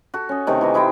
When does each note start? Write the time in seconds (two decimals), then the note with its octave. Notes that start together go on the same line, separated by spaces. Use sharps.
0.14 F#4 A4
0.29 C#4 D#5
0.47 C3 D#3 A3
0.61 E3 G#5 A#5
0.74 D#4 E4 C5 G5